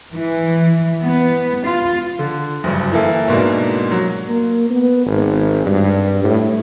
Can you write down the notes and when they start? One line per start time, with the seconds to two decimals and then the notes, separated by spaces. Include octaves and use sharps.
0.12 E3
1.03 B3
1.65 F4
2.19 D3
2.64 F#1 D2 G2
2.92 E3 A#3 E4 A4
3.28 G#2 B2 A#3 D4
3.91 F#3
4.29 A#3
4.70 B3
5.06 G#1
5.66 G2
6.24 A2